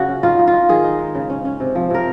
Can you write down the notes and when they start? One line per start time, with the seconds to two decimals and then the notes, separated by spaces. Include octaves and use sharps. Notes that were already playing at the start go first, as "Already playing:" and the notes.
Already playing: C#3 F#3 F#4 G#4
0.08 C#4
0.23 D#4 F4
0.39 D#4
0.47 F4
0.54 D#4
0.69 D#3 G#4
0.84 D#4
0.99 G#3
1.15 C#3
1.30 C#4
1.45 C#4
1.60 C3
1.75 F3
1.90 C3 A#4